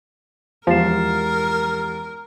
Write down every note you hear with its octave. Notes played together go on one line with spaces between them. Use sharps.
E2 F3 G#3 G4 A#4 A6 C7 E7